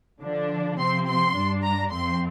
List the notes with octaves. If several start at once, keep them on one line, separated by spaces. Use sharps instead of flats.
D3 F3 D4
C3 F3 C4 C6
C6
G2 G3 D4
A#5
F2 F3 C4 C6